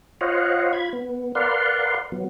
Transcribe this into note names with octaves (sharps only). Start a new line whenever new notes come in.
F4 C5 C#5 D#5 F5 F#5
F4 B5 G#6
B3
A#4 B4 D5 F5 F#5 C6
F#3 B3